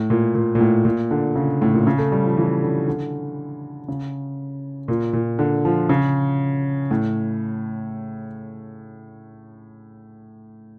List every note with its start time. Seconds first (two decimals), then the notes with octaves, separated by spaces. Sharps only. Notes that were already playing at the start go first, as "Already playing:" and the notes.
Already playing: A2
0.10 A#2
0.35 A#2
0.55 A#2
0.61 A2
0.85 A#2
1.11 D3
1.36 C#3
1.62 A2
1.74 A#2
1.87 C#3
1.98 A3
2.12 G3
2.24 F3
2.37 E3
2.62 D3
2.88 D3
3.88 C#3
4.88 A#2
5.13 A#2
5.39 D3
5.65 F3
5.89 C#3
6.91 A2